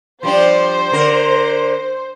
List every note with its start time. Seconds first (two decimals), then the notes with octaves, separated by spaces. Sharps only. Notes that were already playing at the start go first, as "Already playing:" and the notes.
0.23 F3 G3 D4 C5
0.92 D3 A#4